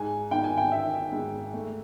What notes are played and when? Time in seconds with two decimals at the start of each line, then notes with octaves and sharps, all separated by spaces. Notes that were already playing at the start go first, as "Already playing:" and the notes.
Already playing: G#2 G#5
0.31 D#3 G5
0.44 G#5
0.57 G5
0.72 D#3 E5
1.12 G#2
1.54 A3